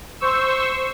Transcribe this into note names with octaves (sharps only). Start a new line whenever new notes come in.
C5 C#6 E6